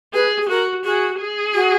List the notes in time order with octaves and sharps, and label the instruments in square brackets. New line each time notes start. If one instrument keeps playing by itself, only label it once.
[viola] G#4 [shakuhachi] B4
[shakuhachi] G#4
[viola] F#4 [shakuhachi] A#4
[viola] F#4 [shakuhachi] G#4
[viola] G#4
[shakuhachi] F#4